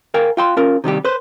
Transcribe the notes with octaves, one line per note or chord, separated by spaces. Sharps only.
A#4 F5 G5 G#5
F4 G5 C6
C#4 F4 A#4
C3 D#3 G3 G4
B4 C5